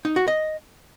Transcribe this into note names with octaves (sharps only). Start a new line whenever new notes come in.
D#4
F#4
D#5